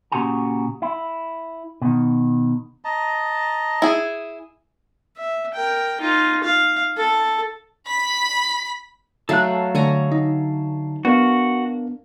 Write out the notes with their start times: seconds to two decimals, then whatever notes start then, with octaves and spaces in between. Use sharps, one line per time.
0.12 A#2 C#3 F#4 G4 G#5 A#5
0.82 E4
1.82 B2 D#3
2.85 D#5 A5 A#5
3.82 E4 G#4
5.17 E5
5.54 A#4 G5
6.00 D#4 F4
6.44 F5
6.97 A4
7.87 B5 B6
9.29 F#3 A3 A4 F5 F#6
9.75 D3 A3 C#5 G#5 A#5
10.12 D#4
11.05 B3 D4 F#4 A#4 F5